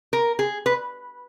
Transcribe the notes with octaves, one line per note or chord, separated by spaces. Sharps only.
A#4
G#4
B4